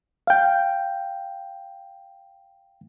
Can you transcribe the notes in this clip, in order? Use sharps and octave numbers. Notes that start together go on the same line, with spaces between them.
F5 G5